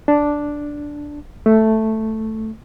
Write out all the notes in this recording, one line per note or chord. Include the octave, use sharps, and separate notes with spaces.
D4
A3